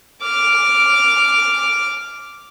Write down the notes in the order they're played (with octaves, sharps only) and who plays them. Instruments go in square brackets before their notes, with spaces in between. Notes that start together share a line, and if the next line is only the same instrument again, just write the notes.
[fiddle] D6 F6